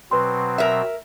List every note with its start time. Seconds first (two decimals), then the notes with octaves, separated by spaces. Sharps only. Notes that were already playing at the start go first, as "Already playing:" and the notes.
0.11 B2 F#3 C4 B4 C6
0.58 A#4 E5